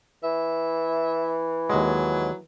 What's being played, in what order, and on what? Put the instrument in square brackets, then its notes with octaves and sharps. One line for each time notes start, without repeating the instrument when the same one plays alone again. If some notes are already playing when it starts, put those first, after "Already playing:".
[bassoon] E3 [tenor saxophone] E5
[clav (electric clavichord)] D#2 G#3 [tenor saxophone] F#3